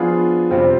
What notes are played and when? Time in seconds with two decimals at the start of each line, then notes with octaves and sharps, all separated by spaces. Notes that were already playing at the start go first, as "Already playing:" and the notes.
Already playing: F3 B3 D4 F4 G#4
0.50 C3 G3 C4 F4 C5